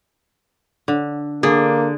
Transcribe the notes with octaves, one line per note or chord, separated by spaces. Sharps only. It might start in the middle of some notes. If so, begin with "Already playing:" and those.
D3
D3 A#3 G#4